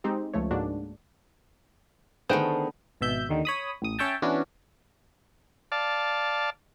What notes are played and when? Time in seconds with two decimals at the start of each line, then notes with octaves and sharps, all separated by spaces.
0.04 G#3 C4 D#4 G4
0.34 C#2 F3 A3 C#5
0.51 G#2 A#3 D4 F#4
2.29 D3 D#3 A3 B3 G#4 C5 G5
3.01 G#1 B2 E5 G6
3.29 D#2 D3 D#3
3.45 C#5 B5 D#6
3.82 A1 D#6
3.99 C#4 C#5 E5 G5 A5
4.22 E3 B3 C#4 D4 F#4
5.72 D5 F5 A5